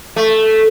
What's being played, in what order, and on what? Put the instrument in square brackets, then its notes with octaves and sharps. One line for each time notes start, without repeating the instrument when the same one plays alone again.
[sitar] A3